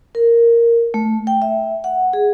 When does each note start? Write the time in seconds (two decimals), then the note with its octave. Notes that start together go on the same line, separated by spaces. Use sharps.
0.15 A#4
0.94 A3
1.27 G5
1.42 E5
1.84 F#5
2.13 G#4